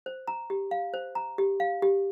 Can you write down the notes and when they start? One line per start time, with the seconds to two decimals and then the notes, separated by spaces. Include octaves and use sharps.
0.06 C5
0.28 A#5
0.50 G4
0.71 F5
0.94 C5
1.15 A#5
1.38 G4
1.60 F5
1.82 G4